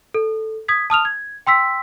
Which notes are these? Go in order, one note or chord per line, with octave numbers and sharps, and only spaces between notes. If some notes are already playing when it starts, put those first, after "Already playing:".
A4
D#6 G#6 B6
A5 D#6 F6 F7
G#6
G5 C6 E6 B6